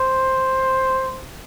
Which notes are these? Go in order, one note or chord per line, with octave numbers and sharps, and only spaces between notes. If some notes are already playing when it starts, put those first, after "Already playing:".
Already playing: C5